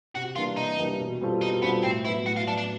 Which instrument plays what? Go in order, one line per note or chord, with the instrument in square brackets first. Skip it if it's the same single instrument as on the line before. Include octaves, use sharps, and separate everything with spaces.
[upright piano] C3 [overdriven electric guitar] F#4
[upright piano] E3 G3 A#3 D4 [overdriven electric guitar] F4
[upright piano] C3 [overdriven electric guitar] D#4
[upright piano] E3 G3 A#3 D4
B2
G3 C4 F4 A4
[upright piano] B2 [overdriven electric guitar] D#4
[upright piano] G3 C4 F4 A4 [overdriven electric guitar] B3
[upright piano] A2 [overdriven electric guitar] C4
[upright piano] F#3 B3 [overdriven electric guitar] E4
[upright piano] A2 [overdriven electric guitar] F#4
[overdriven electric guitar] F4
[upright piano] F#3 B3 [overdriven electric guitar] D4
[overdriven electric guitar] D4